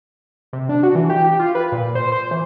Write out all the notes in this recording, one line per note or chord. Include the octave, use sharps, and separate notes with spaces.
C3
D4
F#4
E3
G4
G4
F4
B4
A#2
C5
C5
E3